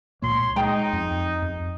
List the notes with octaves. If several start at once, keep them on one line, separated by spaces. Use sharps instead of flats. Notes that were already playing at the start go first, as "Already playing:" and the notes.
C#2 A#2 A#3 C#5 C6
G#3 D#4 G#4 G5 A#5
F2
F2